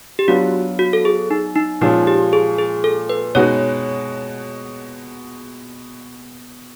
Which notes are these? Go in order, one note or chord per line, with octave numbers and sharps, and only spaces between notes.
G4
F#3 B3 D4 F4 F#4
F#4
A4
G#4
D#4
D#4
A#2 F3 G#3 C#4 D#4
G4
G#4
G#4
A4
B4
B2 G#3 B3 D#4 F#4 C#5